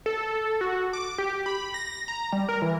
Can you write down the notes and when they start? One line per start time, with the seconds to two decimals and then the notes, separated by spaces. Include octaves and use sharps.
0.06 A4
0.61 F#4
0.93 D6
1.18 G4
1.46 B5
1.74 A#6
2.08 A#5
2.33 G3
2.49 A#4
2.62 E3